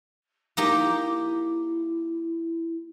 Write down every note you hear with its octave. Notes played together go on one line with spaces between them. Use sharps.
A#3 D#4 E4 G4